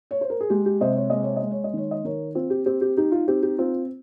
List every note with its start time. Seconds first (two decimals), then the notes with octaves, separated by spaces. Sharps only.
0.11 C#5
0.21 C5
0.30 A#4
0.40 G#4
0.50 G#3 G4
0.66 G4
0.81 C3 C5 D#5
0.96 C#5
1.10 G#3 D#5
1.23 C#5
1.36 D#5
1.42 G#3
1.51 C#5
1.64 D#5
1.73 D#3 C#5
1.91 D#5
2.04 D#3 A#4 C#5
2.35 C4 F4
2.50 G4
2.66 C4 G4
2.81 G4
2.97 D#4 G4
3.12 F4
3.28 C4 G4
3.43 G4
3.58 C4 F4